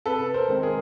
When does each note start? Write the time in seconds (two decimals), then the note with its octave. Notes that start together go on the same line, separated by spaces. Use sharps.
0.06 C3 A4 B4
0.34 A#4 C5
0.48 D#3 G#3 C4
0.63 G#4 A#4